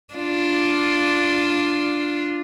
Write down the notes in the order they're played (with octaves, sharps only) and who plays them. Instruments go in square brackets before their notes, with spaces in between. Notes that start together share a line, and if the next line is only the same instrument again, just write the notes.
[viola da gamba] D4 F4